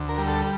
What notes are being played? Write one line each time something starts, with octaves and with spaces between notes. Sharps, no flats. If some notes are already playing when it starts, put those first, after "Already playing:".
Already playing: D2
A#4
G3
A4